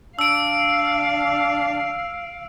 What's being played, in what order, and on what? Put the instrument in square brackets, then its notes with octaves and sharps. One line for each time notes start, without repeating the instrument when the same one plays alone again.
[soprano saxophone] D4 [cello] F5 [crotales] E6 D7